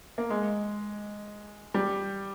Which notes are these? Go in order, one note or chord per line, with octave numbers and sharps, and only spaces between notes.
A#3
G#3
G3